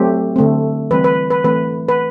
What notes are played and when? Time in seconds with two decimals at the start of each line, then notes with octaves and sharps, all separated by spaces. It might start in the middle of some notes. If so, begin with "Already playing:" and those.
Already playing: F#3 A3 C4 G4
0.36 D3 A3 C4
0.91 E3 G3 C4 B4
1.04 B4
1.30 B4
1.44 E3 A3 C4 B4
1.89 B4